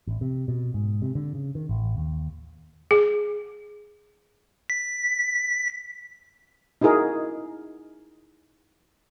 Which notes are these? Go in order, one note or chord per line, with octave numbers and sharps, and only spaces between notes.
A1
C3
B2
G#2
C3
D3
C#3
D#3
A1
D#2
G#4
B6
D#4 E4 F#4 G#4 A#4 D#5